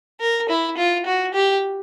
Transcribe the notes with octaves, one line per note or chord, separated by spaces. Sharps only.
A#4
E4
F4
F#4
G4